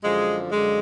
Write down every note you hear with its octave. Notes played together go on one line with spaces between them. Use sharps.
F#2 D3 F3 G#3
F#2 D3 F3 G#3